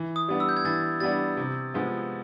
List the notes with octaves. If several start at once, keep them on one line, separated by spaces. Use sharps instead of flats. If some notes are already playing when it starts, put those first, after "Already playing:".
Already playing: E3
D#6
G3 B3 D4
E6
G6
G#6
E3 A6
G3 B3 D4 A6
C3
F3 G#3 B3